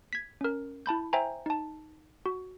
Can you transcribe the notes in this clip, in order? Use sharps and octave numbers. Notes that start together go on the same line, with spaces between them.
G#6 B6
C#4 A#4
E4 A5 B5 G6
C5 E5 G5 G#5 A#5
D#4 A5
F#4